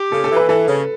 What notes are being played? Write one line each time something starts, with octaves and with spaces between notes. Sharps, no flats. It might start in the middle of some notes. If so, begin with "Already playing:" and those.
Already playing: G4
C#3 A4
A4
E3
B4
E3 A4
C#3